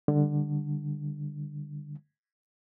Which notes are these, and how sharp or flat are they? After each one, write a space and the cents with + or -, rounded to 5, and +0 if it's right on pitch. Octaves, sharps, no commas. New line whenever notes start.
D3 +10 G3 +20